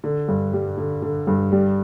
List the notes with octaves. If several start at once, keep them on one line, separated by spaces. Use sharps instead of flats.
D3
G2
G3
D3
D3
G2
G3